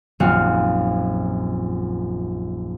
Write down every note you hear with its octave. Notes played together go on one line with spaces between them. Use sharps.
D#1 A#1 F#2 C4 F#4 F5